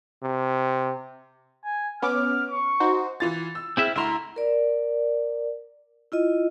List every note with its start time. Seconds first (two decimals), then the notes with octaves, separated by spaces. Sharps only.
0.22 C3
1.64 G#5
2.02 B3 C#4 D6 F6
2.51 C#6
2.80 D#4 F#4 C5
3.20 E3 F4 A6
3.55 E6
3.77 C4 E4 G#4 E5 F6
3.96 D2 E4 E5 A#5 C6
4.36 A#4 D5
6.12 E4 F4 D#5